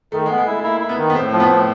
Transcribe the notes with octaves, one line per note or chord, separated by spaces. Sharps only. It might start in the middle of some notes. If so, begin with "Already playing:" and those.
D#3 A3
G#3
B3
G#3
A3 E4
A#3 E4
E4
B3
D#3
B3
A2 C4
F3
B3
A2